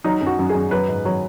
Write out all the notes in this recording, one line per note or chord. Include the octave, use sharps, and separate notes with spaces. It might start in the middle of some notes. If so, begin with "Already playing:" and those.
F#3 D#4
F#2
F#4
F#2
G#4
F#2
F#3 B4
G#2
F#3 C#5